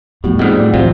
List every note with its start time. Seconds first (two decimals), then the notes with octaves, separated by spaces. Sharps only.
0.24 A2 F3 G3 B3 F#4
0.39 F2 G#2 G3 A3 F#4 D#5 F6
0.58 A2 D5
0.74 C3 E3 F#3 F4